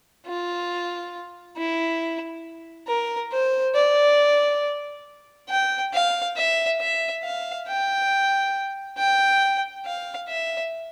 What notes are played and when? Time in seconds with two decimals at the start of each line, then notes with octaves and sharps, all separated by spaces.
0.27 F4
1.57 E4
2.87 A#4
3.32 C5
3.75 D5
5.50 G5
5.94 F5
6.37 E5
6.80 E5
7.23 F5
7.68 G5
8.98 G5
9.86 F5
10.29 E5